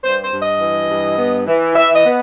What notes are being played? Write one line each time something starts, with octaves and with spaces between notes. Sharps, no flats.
G2 C5
C5
G2
D#5
E3
G2
B3
E3
E3 E5
D#5
B3